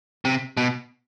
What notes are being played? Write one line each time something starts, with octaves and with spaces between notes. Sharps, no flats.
C3
B2